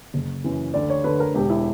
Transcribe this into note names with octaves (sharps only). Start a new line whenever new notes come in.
F#1
F#2 E3
D2 D5
C#5
D3 B4
A#4
E1 G4
E4